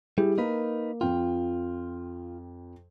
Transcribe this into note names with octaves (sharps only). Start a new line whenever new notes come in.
G3 E4 G4 G#4
A#3 D#4 A#4 B4
F2 F4 G5